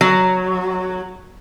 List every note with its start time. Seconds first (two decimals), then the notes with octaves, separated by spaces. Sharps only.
0.01 F#3